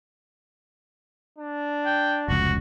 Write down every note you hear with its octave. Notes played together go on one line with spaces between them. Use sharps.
D4
G5
F1 C#2 F#4